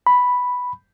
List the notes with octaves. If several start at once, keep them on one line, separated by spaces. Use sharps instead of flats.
B5